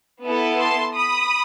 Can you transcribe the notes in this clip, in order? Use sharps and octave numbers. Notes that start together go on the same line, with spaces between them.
B3 E4 A4
A5 C6
B5 D#6